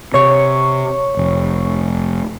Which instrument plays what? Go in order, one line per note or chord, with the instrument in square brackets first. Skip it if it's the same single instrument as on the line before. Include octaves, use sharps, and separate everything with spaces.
[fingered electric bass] C3 [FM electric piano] C#5 C#6
[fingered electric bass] F1